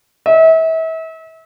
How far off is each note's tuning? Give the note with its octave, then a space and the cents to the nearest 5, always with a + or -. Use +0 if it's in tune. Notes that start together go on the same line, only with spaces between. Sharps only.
E5 -35